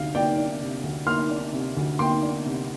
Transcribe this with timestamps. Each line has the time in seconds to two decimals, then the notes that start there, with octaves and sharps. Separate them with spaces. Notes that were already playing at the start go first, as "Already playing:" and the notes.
Already playing: D2 C3 D4 F5
0.15 A#3 D5 G5
0.37 D4
0.61 C3
0.83 D2
1.06 A#3 C6 F6
1.31 D4
1.53 C3
1.77 D2
1.99 A#3 G5 C6
2.23 D4
2.46 C3